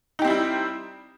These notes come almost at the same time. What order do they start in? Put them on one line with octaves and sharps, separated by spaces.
D#4 G4 C4 E4 G3